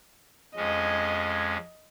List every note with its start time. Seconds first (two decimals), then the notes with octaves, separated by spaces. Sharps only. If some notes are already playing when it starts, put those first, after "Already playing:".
0.56 F2 G#3 C#4 D#5